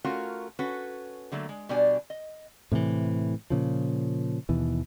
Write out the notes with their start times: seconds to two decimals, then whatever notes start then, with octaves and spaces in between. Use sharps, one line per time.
0.04 A3 C#4 F4 F#4 A#4
0.59 C#4 F#4 A4 B4
1.32 D3 F#3 A3 A#3
1.49 G#3
1.69 B2 G3 D4 D5 G#5
2.10 D#5
2.72 A2 C3 D#3 E3
3.50 A#2 C#3 F3
4.49 D#2 B2 E3